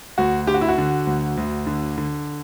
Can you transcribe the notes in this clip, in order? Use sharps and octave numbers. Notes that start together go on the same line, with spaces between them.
D2 F#4
D3 G4
F#4
E4
F#4
D3
D2
D2
D3
D3